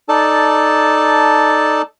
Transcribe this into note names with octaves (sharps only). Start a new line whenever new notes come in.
D#4 A4 D5 A5